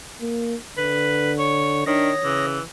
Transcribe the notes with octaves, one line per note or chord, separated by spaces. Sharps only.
A#3
D3 B4
C#5
D#3 D4 C#5 D#6 A#6
C#3 E3